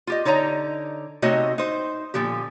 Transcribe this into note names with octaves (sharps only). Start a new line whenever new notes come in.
F4 G4 D#5
D3 D#4 C#5 D#5 A5 A#5
C3 A3 D#4 F#4 C#5 D#5
D#4 C5
A#2 D3 F3 G4